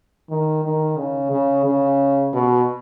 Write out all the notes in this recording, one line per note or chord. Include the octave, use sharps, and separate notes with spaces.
D#3
D#3
C#3
C#3
C#3
B2